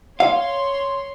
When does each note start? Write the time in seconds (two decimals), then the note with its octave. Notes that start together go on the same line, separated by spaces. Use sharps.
0.20 C#5 F5 C6